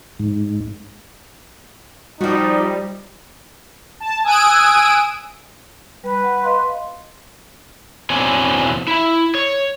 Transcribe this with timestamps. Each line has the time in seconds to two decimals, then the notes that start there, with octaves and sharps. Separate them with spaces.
0.19 G#2
2.21 F3 G3 D#4 F#4
4.00 A5
4.24 G#5 D#6 E6 F#6 D7 D#7
6.04 G3 B4
6.23 F#5
6.43 D#5 F5 C6
8.10 E2 B2 C4 D4 C#5 G#5
8.88 E4
9.35 C#5